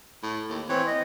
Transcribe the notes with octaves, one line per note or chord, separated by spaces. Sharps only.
A2
D#2
E3 C4 C#5
D#5